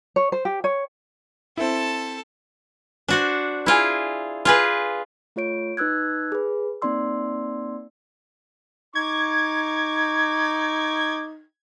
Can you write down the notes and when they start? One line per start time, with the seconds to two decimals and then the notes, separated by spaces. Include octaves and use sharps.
0.16 C#5
0.32 C5
0.45 G4
0.64 C#5
1.57 C4 E4 A4 A5
3.08 D4 F#4 C5
3.66 E4 F4 G#4
4.45 F4 G#4 B4
5.36 A3 F4 C#5 D7
5.77 D#4 B4 E6 F#6 G#6
6.32 G#4 B4
6.82 A#3 C4 D#4 D5 C6 E6
8.95 D#4 C#6 D6 G#6